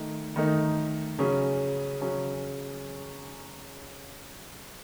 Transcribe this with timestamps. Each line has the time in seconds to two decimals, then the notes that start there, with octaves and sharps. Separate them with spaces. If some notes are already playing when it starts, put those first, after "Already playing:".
Already playing: D#3 A3 D#4
0.36 D#3 A3 D#4
1.19 C#3 F#3 C#4
2.01 C#3 F#3 C#4